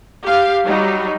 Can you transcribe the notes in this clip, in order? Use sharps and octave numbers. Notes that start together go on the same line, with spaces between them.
G4 F5
F#3 G3 D#4